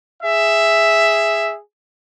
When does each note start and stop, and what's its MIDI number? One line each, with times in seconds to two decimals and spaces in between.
0.22 1.56 68
0.22 1.56 76